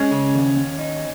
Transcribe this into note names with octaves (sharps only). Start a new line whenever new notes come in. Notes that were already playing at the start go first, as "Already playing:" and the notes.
Already playing: G#3 C#4
C#3
D#2
D#2
D#4